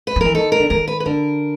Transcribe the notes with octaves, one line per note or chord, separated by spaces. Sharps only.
B4
F3
E3 A#4
D#3 A4
A#4
D3
D#3 A#4
B4
B4
D3 A#4